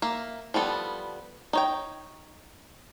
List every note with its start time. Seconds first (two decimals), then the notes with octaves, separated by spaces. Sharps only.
0.02 A#3 E5
0.54 F3 G3 B3 A4
1.53 D#4 C#5 G5